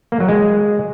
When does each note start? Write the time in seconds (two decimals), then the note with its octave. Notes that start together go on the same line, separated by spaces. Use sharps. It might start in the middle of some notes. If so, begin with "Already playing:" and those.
0.12 A#3
0.20 F#3
0.28 G#3